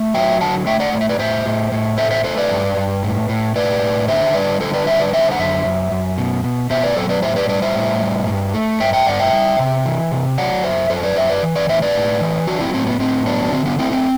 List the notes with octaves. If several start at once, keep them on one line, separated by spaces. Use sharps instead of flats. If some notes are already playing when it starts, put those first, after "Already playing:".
Already playing: A3
F#3 E5 G5
D3 F#5 A5
A3 E5 G5
D5 F#5
A2 D5
E5
B4 D5
A2 C5 E5
A2
A2
A3 C5 E5
C5 E5
A3 A4 C5
B4 D5
G2
G2
A2
A2
A2 B4 D5
A2
D3 C5 E5
G3 B4 D5
D3 A4 C5
B4 D5
G3 C5 E5
B4 D5
D3 C5 E5
F#5
F#2 C5 E5
F#2
F#2
B2
B2
B2 C5 E5
B4 D5
F#3 A4 C5
B4 D5
A2 C5 E5
B4 D5
G3 B4 D5
C5 E5
A2
G3
G2
A3
G2 E5 G5
E5 G5
G2 D5 F#5
E5 G5
G3
C3
E3
C3
F#3 D5 F#5
F#2 C5 E5
F#2 A4 C5
B4 D5
F#2 C5 E5
B4 D5
E3
B4 D5
A2 C5 E5
B4 D5
A2
E3
F#3 D4 F#4
C4 E4
A2 C4
B3
A2 C4
F#3 B3 D4
D3 C4
B3 D4
A3 C4 E4
C4